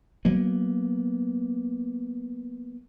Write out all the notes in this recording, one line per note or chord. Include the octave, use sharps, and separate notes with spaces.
F#3 A#3 B3